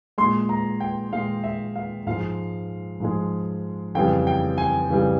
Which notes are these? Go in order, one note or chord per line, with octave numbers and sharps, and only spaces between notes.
A#2 G#3 C6
A#5
G5
A#2 G#3 F5
E5
F5
G#2 F3 G#3 F5
G#2 F3 G#3
F2 C#3 E3 G3 G5
G5
G#5
F2 C#3 E3 G3